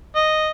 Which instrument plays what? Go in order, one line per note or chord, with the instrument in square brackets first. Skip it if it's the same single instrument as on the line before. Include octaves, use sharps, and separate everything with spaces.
[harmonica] D#5